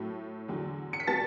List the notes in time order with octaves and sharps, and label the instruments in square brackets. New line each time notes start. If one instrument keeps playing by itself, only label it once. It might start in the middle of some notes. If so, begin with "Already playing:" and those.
Already playing: [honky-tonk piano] A2 F#3 A3
E2 D3 F#3
C#7
B6
B2 G3 B3 A5 A6